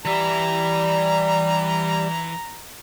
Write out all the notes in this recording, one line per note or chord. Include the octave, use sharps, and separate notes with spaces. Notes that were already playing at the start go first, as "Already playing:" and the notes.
E3 G3 E5 A#5